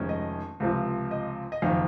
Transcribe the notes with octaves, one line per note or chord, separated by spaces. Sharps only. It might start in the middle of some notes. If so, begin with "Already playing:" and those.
Already playing: F1 F2 D#3 G#3 C#4
D#5
C#2 C3 F3
D#5
D#5
F#1 F2 D#3 F5